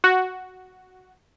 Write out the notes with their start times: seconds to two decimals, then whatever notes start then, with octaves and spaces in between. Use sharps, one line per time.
0.04 F#4